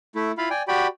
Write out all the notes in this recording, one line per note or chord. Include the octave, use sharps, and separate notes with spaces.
A3 E4
E4 F4 F5 B5
D5 G5 G#5
F#4 G4 D5 G5 B5